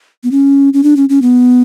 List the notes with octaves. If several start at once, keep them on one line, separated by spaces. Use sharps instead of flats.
B3
C#4
C#4
D4
C#4
C#4
B3